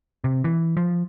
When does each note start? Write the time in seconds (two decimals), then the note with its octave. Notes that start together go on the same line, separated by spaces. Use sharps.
0.24 C3
0.44 E3
0.77 F3